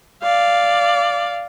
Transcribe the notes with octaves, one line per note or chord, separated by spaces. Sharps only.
D5 F5